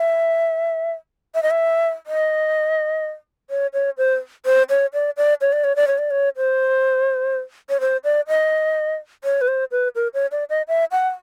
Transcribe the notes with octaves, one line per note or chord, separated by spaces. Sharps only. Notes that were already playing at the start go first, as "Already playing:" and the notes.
Already playing: E5
E5
D#5
E5
D#5
C#5
C#5
C5
C5
C#5
D5
D5
C#5
D5
C#5
D5
C#5
D5
C#5
C5
C#5
C5
D5
D#5
C#5
B4
C5
B4
A#4
C#5
D5
D#5
E5
F#5